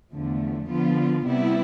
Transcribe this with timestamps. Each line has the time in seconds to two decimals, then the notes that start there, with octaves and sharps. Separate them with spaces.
0.12 E2 D3 F3 A3
0.69 D3 F3 B3 F4
1.25 C3 G3 B3 E4